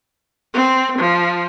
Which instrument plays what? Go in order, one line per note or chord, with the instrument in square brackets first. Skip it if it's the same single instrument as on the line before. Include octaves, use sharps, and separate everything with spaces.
[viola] C4
F3